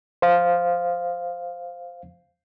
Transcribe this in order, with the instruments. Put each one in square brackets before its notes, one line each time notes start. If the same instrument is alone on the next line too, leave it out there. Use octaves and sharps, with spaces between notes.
[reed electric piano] C5 F5